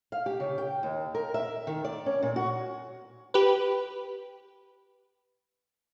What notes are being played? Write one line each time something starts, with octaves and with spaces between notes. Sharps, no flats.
F5
G4
C#3
G5
D#2
A#4
E5
D#3
D5
C#4
A#2
F#4
G4 B4